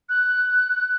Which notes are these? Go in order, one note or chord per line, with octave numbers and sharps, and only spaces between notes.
F#6